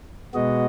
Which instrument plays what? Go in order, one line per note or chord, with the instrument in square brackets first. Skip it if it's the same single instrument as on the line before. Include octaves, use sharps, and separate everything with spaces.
[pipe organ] B2 G#3 B3 F#4 D#5